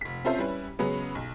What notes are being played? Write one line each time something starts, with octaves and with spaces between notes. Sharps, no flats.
F1 B6
C4 C#4 F4 A4 C5 E5
G3 C#4 E4 B4
C#3 F#3 G#3 B3 C#4
B1